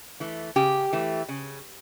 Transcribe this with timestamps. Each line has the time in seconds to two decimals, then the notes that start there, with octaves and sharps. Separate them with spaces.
0.20 E3 A3
0.56 C#3 G4
0.93 E3 A3
1.29 C#3